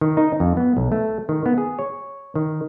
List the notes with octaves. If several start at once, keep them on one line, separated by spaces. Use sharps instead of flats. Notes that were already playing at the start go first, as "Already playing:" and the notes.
D#3
D#4
F2
B3
B1
A3
D#3
B3
G#4
C#5
D#3